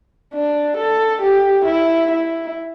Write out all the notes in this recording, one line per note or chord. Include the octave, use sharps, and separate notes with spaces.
D4
A4
G4
E4
E4